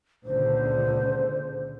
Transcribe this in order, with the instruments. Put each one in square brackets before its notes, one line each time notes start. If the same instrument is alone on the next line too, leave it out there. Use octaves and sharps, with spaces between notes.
[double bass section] C#2 A#2 D3 [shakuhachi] C5